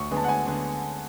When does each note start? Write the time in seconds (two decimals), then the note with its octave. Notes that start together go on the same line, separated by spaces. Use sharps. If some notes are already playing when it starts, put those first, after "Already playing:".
Already playing: D2 C#6
0.11 D3 G#3 B3
0.17 A5
0.24 F#5
0.28 D2 G#5
0.46 D3 G#3 B3